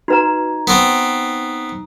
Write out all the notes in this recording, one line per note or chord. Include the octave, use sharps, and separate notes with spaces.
D#4 F#4 B4 A#5
B3 C4